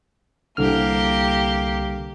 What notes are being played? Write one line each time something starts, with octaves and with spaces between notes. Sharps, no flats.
C2 D3 A#3 G4 F6